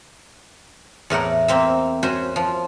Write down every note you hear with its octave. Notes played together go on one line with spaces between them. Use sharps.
E2 A2 A#4 F#5
A#3 C4 E5
C#4 F#4 C5
F3